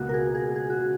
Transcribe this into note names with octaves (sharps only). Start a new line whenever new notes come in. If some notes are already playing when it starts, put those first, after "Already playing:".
Already playing: C#2 B2 A#3 F#4
A#4
G#4
G#4
G#4
F#4
C#3